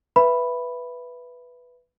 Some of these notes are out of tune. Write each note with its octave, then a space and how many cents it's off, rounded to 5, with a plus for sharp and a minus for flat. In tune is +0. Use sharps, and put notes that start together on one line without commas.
B4 +0 E5 +15 B5 +0